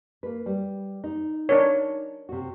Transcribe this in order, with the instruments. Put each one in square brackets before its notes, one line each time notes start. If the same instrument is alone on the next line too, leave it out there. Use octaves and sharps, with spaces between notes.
[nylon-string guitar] A#3 B4
G3
D#4
[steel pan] D4 A#4 C#5
[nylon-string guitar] C3 F#4